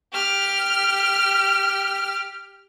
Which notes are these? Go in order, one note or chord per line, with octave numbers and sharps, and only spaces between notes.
G4 F6